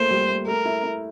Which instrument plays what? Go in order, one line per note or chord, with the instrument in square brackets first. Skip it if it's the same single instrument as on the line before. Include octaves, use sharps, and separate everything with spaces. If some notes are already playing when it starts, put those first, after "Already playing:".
Already playing: [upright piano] A3 A#3 F4 [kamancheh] C5
[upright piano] G3
A3
[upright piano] A3 [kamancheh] A#4
[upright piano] E4
E4